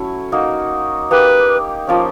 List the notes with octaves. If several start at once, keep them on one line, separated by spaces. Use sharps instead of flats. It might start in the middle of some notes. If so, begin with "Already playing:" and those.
Already playing: F#3 A3 C#4 E4
A#3 D#4 F#4
A#3 D#4 G4 B4
F3 A#3 C#4